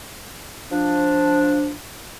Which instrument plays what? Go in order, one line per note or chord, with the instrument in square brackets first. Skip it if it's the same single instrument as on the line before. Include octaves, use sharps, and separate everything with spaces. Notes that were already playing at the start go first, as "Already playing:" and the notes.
[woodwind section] F3 D4